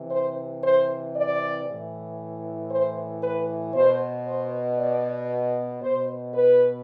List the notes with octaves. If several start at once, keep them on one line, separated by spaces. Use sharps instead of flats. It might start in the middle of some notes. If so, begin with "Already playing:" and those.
Already playing: C3 E3
C5
C5
D5
A2 E3
C5
B4
B2 C5
C5
D5
B2 C5
B4